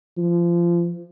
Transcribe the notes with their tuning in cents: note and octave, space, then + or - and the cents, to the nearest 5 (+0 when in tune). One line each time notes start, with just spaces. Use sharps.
F3 -25